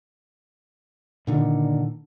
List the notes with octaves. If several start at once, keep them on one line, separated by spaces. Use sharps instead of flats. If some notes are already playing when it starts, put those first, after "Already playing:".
A#2 D3 D#3